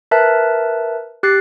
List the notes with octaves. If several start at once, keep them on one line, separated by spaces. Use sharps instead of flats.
A#4 B4 E5 A5 F#6
G4 F#6 A6 C7